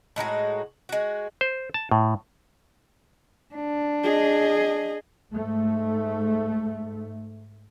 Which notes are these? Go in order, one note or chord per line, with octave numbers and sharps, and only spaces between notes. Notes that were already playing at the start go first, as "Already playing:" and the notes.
A2 G#3 D#4 F#4
G#3 F#4
C5
A5
A2
D4
G#4 D#5
G#2 A3